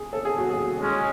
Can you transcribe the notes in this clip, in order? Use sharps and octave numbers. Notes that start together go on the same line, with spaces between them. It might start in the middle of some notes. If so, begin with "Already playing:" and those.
Already playing: G#4
A4
G#4
F#4
G#4
G#3 C#4